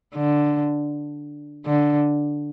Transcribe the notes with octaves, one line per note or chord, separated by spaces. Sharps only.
D3
D3